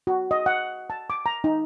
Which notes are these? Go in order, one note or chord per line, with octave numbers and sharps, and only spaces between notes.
F#4
D#5
F#5
A5
D6
A#5
D#4